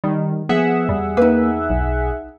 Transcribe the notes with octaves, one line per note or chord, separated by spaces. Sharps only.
D#3 G3
F3 B3 G#4 E5 F#5
E2 G3
A#3 D#4 B4
B1